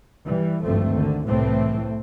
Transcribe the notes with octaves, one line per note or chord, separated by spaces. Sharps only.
E3 G3
G#1 D2 G2 F3 A3 C4
D3 D#3
C2 A2 E3 A3 C4